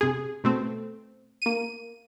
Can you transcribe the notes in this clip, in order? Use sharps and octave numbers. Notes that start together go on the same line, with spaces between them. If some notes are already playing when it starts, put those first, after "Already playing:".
C3 G#4
B2 A3 C4
A#3 D#7